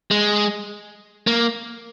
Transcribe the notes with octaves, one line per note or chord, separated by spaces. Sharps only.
G#3
A#3